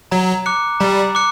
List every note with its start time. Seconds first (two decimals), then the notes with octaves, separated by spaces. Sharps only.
0.11 F#3 A#5
0.46 D6 F#6 C#7
0.80 G3 A#5
1.15 D6 F#6 C#7